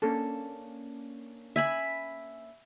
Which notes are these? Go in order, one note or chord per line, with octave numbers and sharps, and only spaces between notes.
A#3 C#4 D4 A4
E5 G#5 B5